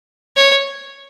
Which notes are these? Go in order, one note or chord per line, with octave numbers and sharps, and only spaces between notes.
C#5